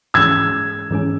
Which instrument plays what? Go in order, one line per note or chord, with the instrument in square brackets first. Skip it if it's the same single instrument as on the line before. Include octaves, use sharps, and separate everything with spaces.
[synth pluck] G#2 E3 G#3 C#4 G#4 [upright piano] E6 G#6
[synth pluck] G#2 E3 G#3 C#4 G#4